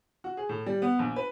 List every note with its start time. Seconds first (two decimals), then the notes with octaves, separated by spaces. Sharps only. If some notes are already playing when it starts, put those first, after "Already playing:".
0.24 F#4
0.37 G#4
0.49 A2
0.66 G3
0.82 B3
0.99 A#1
1.16 B4